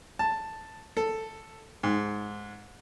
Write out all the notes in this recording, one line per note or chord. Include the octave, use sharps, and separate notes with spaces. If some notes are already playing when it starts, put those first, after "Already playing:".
A5
A4
G#2